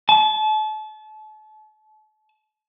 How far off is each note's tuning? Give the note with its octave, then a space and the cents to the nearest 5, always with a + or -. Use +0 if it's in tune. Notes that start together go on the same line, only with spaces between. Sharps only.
A5 -35